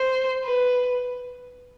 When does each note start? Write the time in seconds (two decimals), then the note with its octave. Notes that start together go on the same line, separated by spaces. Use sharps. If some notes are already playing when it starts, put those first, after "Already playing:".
Already playing: C5
0.44 B4